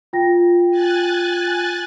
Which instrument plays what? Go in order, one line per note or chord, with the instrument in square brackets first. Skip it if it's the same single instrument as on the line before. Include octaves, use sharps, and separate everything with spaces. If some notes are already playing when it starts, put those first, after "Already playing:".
[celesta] F4 G5 A#6
[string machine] G#5 F#6 A6